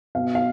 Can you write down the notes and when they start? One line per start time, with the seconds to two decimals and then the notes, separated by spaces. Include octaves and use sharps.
0.15 B2 F5
0.35 F5